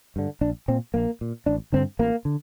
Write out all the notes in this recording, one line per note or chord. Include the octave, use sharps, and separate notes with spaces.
G2 D3
A#1 D4
A#2 C4
A#1 A#3
A#2
A1 D4
G2 D3 C4
A1 A#3
D3